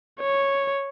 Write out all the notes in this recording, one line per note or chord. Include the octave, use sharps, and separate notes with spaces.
C#5